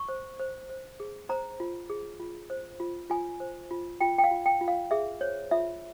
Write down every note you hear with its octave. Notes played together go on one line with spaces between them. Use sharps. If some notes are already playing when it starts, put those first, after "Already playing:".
Already playing: C#6
C5
C5
C5
G#4
C5 A#5
F4
G#4
F4
C5
F4
F4 G#5
C5
F4
F4 G5
G5
F5
F4
G5
F4
F5
G#4 E5
C5 C#5
F4 E5